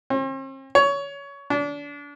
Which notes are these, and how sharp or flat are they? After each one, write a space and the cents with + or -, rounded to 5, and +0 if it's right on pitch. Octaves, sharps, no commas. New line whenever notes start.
C4 +45
C#5 +20
D4 -30